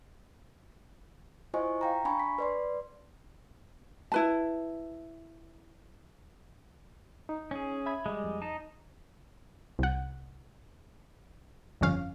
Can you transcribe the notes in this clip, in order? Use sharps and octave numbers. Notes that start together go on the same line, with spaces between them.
E4 F4 C5 D#5 G#5 C#6
F5 G5 A#5
D4 G#5 B5 C#6
B6
B4 D5 C6
E4 B4 A5
D#4
C#4 G#4
E5 B5 G#6
G3 G#3
F2
D#4 A5
C2 F#5
G1 F2 C#4 F5